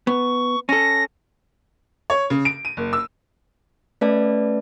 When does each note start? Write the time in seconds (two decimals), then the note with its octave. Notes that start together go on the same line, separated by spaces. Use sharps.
0.07 B3 C#6
0.69 C#4 A4 A#6
2.10 C#5
2.30 C#3
2.45 D7
2.65 D#7
2.77 F#1
2.93 E6
4.01 A3 C#4 B4 D5 E5 A5